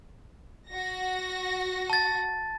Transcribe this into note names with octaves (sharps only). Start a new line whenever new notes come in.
F#4 A#6
A5 A6